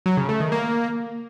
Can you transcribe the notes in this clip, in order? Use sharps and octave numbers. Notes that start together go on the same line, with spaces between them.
F#3
C#3
A3
D#3
A#3